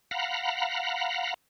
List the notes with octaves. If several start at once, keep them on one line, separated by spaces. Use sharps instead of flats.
F5 F#5 A#5 B5